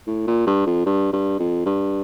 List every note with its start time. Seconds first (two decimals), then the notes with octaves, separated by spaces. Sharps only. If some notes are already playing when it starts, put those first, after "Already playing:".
0.07 A2
0.27 A#2
0.47 G2
0.67 F2
0.86 G2
1.13 G2
1.39 F2
1.66 G2